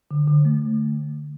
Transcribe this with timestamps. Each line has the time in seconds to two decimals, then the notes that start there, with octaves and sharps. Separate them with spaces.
0.11 D3
0.28 D3
0.45 A3